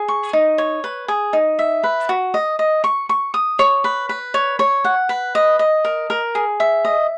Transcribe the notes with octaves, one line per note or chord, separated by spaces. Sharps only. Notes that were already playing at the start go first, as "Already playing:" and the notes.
Already playing: G#4
C#6
D#4
C#5
B4
G#4
D#4
E5
B4
F#4
D#5
D#5
C#6
C#6
D#6
C#5
B4
B4
C#5
C#5
F#5
B4
D#5
D#5
A#4
A#4
G#4
E5
D#5